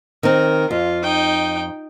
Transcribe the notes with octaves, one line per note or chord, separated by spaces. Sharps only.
D#3 C4 A#4
F2 F4
D#4 G5